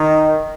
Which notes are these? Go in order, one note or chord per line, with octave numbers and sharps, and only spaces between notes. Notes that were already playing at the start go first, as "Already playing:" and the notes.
Already playing: D#3